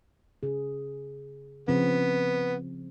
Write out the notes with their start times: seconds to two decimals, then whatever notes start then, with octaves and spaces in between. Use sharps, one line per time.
0.43 C#3 G#4
1.68 C#3 F3 B3 C4